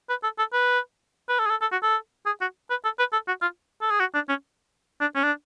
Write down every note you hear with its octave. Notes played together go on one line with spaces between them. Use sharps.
B4
A4
A4
B4
B4
A4
G#4
A4
A4
F#4
A4
G#4
F#4
B4
A4
B4
A4
F#4
F4
A4
G#4
F#4
D4
C#4
D4
C#4
D4